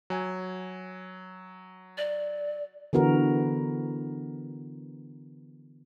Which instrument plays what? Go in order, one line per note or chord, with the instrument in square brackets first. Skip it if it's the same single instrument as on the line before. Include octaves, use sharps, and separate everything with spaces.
[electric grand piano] F#3 G#5
[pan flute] D5
[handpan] D3 E3 B3 F#4 A#4